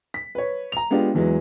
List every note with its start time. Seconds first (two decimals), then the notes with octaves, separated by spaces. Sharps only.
0.14 B6
0.35 B4 C#5
0.72 A#5 F7
0.91 G#3 B3 D4 F4 G4
1.15 E2 E3 F#3 G#3